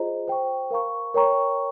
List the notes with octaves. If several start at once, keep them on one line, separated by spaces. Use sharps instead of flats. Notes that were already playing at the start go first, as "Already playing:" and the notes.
Already playing: F4 G#4 C5 D#5 A#5
C5 G5 C#6
A#4 F5 A#5 C#6
A#4 C#5 G5 A#5 C#6